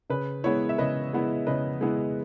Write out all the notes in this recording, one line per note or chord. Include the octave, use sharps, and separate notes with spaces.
C#3 B4
G#3 B3 E4 C#5
E5
C#3 B4 D#5
G#3 B3 E4
C#3 B4 D#5
G#3 B3 E4